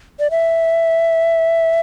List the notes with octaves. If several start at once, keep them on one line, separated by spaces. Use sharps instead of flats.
D5
E5